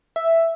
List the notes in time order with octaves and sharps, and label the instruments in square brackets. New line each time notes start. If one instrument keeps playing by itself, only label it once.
[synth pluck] E5